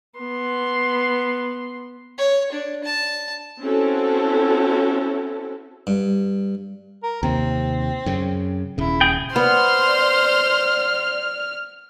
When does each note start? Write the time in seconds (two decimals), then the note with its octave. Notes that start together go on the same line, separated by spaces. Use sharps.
0.19 B3 C6
2.18 C#5
2.52 D4
2.84 A5
3.60 C4 C#4 E4 F#4 A4
5.87 G2
7.03 A#4
7.23 D#2 C3 C4
8.06 F#2 C#3
8.78 D#1 C#3 E4
9.01 G#4 G5
9.36 B3 C5 D5 C6 F6